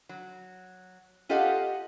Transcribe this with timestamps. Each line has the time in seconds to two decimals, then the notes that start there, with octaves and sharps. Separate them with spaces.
0.09 F#3
1.29 F4 G4 A4 D#5 F5 F#5